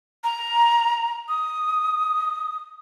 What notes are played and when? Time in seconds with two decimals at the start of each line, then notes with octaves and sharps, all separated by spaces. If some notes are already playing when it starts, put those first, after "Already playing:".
0.24 A#5
1.29 D#6